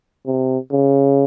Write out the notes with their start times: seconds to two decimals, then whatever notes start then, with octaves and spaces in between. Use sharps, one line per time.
0.26 C3
0.71 C#3